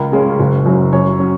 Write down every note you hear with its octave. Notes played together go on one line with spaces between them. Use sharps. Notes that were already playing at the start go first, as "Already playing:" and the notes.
Already playing: C#2 A#4
C#3 G#3 C#4
F#1
F#2 F#3
F#2 C#5
F#3 C#4